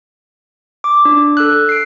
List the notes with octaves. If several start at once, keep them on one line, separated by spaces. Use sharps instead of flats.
D6
D4
A4 E6 F#6
C7 D7